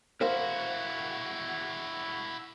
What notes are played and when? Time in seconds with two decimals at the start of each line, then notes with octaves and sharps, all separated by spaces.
0.21 E4 F#4 A#4 C5 F5